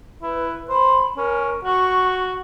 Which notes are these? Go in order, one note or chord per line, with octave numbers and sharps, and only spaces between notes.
E4 B4
C5 B5
C#4 A#4
F#4 C#6